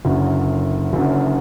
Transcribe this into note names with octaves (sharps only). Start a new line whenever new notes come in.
F#1 F#2 D3
F#1 F#2 D3